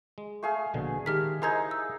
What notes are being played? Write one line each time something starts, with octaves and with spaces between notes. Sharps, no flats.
G#3
A3 G#4 F5
A#1 B2 D3
D#3 G#3 G4 A#4 F6 B6
D#4 E4 G#4 A#4 C5 E5 A#5 G#6
E6